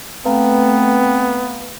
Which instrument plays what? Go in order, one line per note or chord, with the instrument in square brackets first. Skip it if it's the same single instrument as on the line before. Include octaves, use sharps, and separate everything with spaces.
[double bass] A3 [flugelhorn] B3 [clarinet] C4 [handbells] B4 F5 A#5